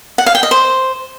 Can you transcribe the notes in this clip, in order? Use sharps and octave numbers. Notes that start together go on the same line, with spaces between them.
F#5
F5
G5
D#5
C5